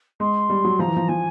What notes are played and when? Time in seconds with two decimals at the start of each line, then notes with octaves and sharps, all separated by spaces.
0.20 G#3 C6
0.50 G3
0.65 F#3
0.79 F3 A#5
0.88 E3
0.96 F3
1.08 F3 G#5